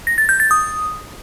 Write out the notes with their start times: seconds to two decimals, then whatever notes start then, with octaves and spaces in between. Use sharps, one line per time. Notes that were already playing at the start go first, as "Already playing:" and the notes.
0.07 A#6
0.18 A6
0.29 G6
0.40 A6
0.51 D#6